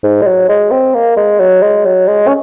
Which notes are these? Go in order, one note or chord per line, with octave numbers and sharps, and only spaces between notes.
G#2
G#3
F#3
G#3
C4
A#3
G#3
F#3
G#3
F#3
G#3
C#4